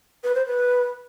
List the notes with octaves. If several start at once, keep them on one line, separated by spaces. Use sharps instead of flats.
B4
C5
B4